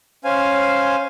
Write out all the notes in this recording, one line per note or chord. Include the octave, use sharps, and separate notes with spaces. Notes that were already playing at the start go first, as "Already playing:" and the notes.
C#4 C5 F5 G#5